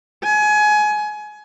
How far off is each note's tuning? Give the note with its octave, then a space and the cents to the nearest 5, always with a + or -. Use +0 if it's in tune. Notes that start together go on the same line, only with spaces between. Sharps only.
G#5 +25